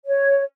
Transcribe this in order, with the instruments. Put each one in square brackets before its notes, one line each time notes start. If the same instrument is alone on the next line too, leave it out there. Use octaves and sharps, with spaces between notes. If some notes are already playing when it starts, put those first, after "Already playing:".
[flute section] C#5